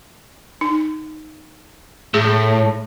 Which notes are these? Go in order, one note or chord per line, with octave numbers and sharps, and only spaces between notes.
D#4
A2 G#4